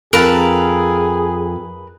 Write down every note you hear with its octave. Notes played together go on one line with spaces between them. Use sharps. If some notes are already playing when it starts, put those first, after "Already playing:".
F2 G#4 A#4 B4 A5